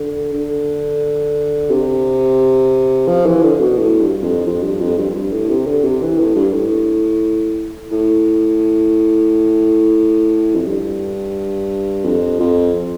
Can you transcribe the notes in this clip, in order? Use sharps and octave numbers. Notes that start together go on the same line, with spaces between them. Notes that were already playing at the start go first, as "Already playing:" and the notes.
Already playing: D3
D3
C3
F3
E3
D3
B2
A2
G2
F2
F2
G2
F2
G2
G2
A2
C3
D3
C3
E3
A2
G2
A2
A2
F2
G2
F2
F2